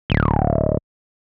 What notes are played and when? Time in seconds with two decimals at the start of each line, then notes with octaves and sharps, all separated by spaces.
0.10 D1